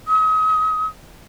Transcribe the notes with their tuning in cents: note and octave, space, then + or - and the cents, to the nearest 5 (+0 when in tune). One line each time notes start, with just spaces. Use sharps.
D#6 +35